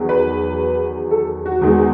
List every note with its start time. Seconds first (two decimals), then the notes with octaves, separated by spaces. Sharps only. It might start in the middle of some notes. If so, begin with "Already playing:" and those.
Already playing: E2 D#3 F#3
0.09 B4
1.11 A4
1.46 F#4
1.61 E2 D#3 G#3